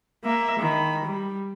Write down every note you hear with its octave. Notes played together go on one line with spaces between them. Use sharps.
A#3 E5
D#3 B5
G3